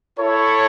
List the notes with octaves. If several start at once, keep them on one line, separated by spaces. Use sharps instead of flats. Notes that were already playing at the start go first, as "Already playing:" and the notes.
E4 A4 C#5